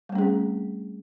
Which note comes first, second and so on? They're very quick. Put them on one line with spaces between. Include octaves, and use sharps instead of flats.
G3 A3 C#4 G#4 C4